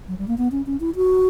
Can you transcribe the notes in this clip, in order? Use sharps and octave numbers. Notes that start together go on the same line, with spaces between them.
F#3
G3
A#3
B3
C#4
C#4
E4
F#4